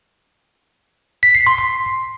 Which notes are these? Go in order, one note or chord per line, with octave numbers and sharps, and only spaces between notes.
B6
C7
C6
C6